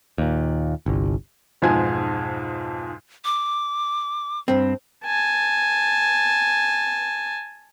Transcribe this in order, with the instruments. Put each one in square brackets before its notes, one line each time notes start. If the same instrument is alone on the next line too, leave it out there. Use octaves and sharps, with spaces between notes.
[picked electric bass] D#2 A#2
G1 C2
[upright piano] B1 F2 G#2 G#3 G#5 G#6
[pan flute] D6
[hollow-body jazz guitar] G2 C4
[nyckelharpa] G#5 A5